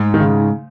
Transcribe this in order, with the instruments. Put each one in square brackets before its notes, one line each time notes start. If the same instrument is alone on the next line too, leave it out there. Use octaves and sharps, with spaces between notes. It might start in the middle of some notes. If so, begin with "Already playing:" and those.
Already playing: [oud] G#2
[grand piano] D#3
C#3